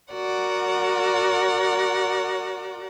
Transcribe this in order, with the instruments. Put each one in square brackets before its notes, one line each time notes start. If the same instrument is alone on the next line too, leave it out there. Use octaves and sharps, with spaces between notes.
[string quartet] F#4 A#4 D5 F#5